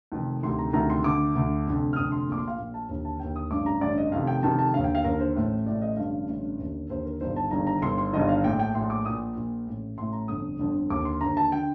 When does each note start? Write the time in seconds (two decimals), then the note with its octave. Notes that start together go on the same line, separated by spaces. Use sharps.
0.12 F1 F2 D#3
0.43 D2 C3 D#3 C6
0.58 A#5
0.73 D2 C3 D#3 A#5
0.90 C6
1.04 D2 D3 D6
1.35 D2 D3
1.66 F1 F2 D3
1.93 F6
1.96 F1 F2 D3 D#6
2.12 C6
2.27 A#1 A#2 D6
2.38 C6
2.48 F5
2.59 A#1 A#2
2.74 A5
2.89 D#2 D3
3.05 A5
3.20 D#2 D3 G5
3.36 D#6
3.51 A1 G2 D3 D6
3.66 A#5
3.81 A1 G2 D3 D5
3.98 D#5
4.12 F1 F2 C3 D#3 F5
4.27 G5
4.43 F1 F2 C3 D#3 A5
4.59 A5
4.74 D3 F5
4.78 D#2
4.84 G5
4.95 F5
5.04 D#2 D3 A#4
5.20 C5
5.36 A1 A2
5.66 A1 A2 D5
5.82 D#5
5.97 A1 G2 D3 F5
6.29 A1 G2 D3
6.59 D#2 D3
6.90 D#2 D3 C5
7.05 A#4
7.21 G1 G2 D#3 C5
7.36 A5
7.51 G1 G2 D#3 A#5
7.67 A#5
7.81 G1 G2 D#3 C6
7.98 C6
8.13 G1 G2 D#3 D#5
8.29 F5
8.44 A#1 A2 G5
8.59 G5
8.75 A#1 A2 C6
8.90 D6
9.05 A#1 A#2 D#6
9.36 A#1 A#2
9.67 A1 A2
9.97 A1 A2 C6
10.13 A#5
10.28 G1 F2 D3 D#6
10.59 G1 F2 D3
10.90 D#2 D3 D6
11.05 C6
11.21 D#2 D3 A#5
11.37 A5
11.52 D3 G5